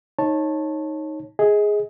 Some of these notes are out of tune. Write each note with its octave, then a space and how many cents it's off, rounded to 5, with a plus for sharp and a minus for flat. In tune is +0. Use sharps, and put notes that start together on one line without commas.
D#4 +5 C#5 -20 A5 +0
G#4 +0 D#5 +30